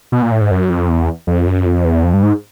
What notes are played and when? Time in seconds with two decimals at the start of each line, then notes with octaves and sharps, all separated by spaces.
0.12 B2
0.22 A#2
0.32 A2
0.41 G#2
0.51 F#2
0.70 F2
0.89 E2
1.27 F2
1.47 F#2
1.66 F2
1.85 E2
2.04 F2
2.13 G2
2.23 G#2